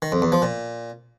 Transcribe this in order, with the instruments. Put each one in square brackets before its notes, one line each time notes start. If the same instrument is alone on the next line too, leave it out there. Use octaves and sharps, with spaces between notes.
[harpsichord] D#3
F2
E2
F3
A#2